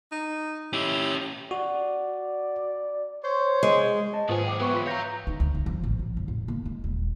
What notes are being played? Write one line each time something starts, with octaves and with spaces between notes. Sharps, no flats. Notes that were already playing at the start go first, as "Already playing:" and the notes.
D#4
C#4 E4 G4
F#4 D5
C5 C#5
G#3
D#5 A5
D#2 G#2 F4 G#4 B4 C5 D#6
E5 G5 D6
E3 F#3 B3 B4 E5 C#6
F4 B6
C#5 F5 A#5 G6 A#6
D#4
D2
D#4
F3
A1
B2
F2
A2
A#3
G#3
D#1